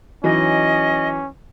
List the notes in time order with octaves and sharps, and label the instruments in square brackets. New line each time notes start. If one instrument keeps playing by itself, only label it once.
[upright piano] E3 F#3 D#4 [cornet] C#4 [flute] D#5